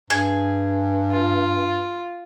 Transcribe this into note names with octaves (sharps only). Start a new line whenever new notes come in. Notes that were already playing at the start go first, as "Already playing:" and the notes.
G2 G#4
F4